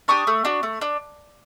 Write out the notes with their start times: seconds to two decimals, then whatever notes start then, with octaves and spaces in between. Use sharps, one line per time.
0.08 D4 G4 C#6 D#6
0.27 A3
0.45 D4 F#4
0.63 A3
0.81 D4